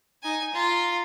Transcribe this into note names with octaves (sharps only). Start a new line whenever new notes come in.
D#4 G#5
F4 A#5